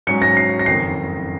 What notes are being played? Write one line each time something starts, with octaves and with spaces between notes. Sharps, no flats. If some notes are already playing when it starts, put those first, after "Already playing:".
G#2 F#3 C#4 C#7
A#6
C7
A#6
F#1 F2 D#3 C7